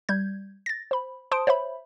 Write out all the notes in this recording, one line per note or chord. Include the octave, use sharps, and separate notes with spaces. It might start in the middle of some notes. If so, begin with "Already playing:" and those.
G3 G6 G#6
A6 A#6
C5 B5
C5 A5 C6 D#6 D7
C5 C#5 E5 B5